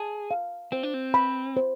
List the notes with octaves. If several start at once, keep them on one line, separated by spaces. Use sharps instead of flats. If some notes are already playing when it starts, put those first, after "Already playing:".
Already playing: G#4 A5
F5
C4 C5
D4
C4
B5
C5